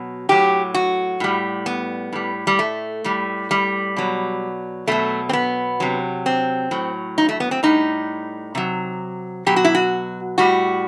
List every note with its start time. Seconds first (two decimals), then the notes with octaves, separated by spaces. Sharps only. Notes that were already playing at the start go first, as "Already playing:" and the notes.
Already playing: B2 F#3
0.29 A2 F#3 G4
0.74 F#4
1.20 A2 G3
1.66 B3
2.13 A2 G3
2.47 G3
2.59 A3
3.04 A2 G3
3.51 G3
3.96 B2 F#3
4.88 B2 F#3 A3
5.29 C4
5.33 B3
5.80 C3 F#3
6.26 C4
6.71 A2 F#3
7.18 D#4
7.29 A3
7.40 B3
7.51 C4
7.63 A2 G3 D#4
8.55 C3 F#3
9.46 B2 F#3 G4
9.56 F#4
9.64 E4
9.75 F#4
10.38 A2 G3 F#4